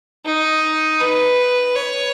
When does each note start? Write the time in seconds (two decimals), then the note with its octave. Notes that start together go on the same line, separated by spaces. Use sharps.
0.26 D#4
1.00 B4
1.76 C#5